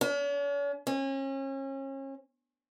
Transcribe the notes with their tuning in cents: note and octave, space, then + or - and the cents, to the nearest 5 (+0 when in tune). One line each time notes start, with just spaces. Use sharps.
C#4 +45
C#4 -35